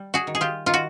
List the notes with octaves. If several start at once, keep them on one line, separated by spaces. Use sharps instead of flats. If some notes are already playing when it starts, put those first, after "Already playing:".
Already playing: G3
F#4 G#4
D#3
G#4
F4 G4
D#3 F4
F#4